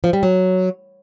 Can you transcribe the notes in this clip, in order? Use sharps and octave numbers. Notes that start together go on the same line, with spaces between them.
F3
G3
F#3